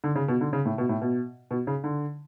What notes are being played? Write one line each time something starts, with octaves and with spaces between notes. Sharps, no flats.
D3
C#3
B2
D3
C#3
A2
B2
A2
B2
B2
C#3
D3